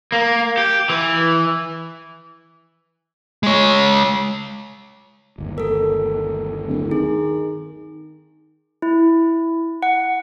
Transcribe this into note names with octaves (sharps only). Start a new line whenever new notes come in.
A#3
G4
E3
G#3 C#5
G1 D#2
A4 A#4
D1
D#3 G#4
E4
F#5